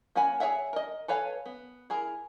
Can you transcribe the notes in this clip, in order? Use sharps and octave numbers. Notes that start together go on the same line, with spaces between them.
A#3 C#4 F#5 G#5 B5
G#4 A#4 C#5 E5 F#5
A#4 D#5
A4 B4 C#5 F5 G#5
B3
E4 G#4 A#4